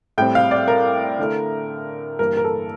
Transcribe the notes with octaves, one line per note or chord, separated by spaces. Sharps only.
A2 G3 C4 G5
F5
D5
A#4
D3 A3 E4
G2 E3 A#3 A#4
A#4
A4